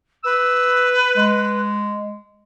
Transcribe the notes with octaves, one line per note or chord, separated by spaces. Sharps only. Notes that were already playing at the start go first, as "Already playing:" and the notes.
B4 E6
G#3